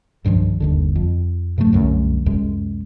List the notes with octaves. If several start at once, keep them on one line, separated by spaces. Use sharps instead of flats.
C2 G2 D#3 F3
G1 D#2 D3
F2
G2 C3 F#3 A3
C2 F#2 D3 A3
C#2 F#2 C3 G#3